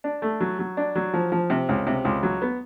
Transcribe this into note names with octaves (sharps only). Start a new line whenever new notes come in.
D4
A3
F#3
F#3
D4
F#3
F3
F3
C3
C#2
C3
C#2
F#3
B3